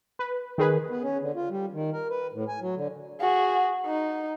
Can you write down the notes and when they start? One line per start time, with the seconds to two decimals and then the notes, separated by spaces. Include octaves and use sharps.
0.19 B4
0.58 D#3 G#4 B4
0.90 B3
1.03 C#4
1.21 D3
1.35 F4
1.50 G3
1.72 D#3
1.93 A#4
2.10 B4
2.33 A2
2.48 G#5
2.61 F#3
2.77 D3
3.20 F#4 G#4
3.86 D#4